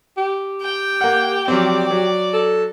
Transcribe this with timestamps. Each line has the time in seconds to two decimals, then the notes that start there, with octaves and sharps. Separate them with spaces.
0.17 G4
0.62 G5
1.01 A#3 F#5
1.48 F3 F#3 C4 D5
1.91 F#3
2.33 A4